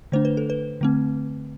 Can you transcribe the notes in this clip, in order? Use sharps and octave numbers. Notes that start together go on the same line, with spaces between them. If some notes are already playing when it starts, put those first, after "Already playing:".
D3 A3 D4 C5
B4
A4
B4
D3 A3 C4